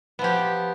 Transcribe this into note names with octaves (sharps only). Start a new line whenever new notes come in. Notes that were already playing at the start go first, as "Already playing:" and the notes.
F3 B3 G4